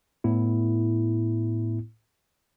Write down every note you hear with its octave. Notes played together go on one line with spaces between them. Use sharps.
A2 B3 E4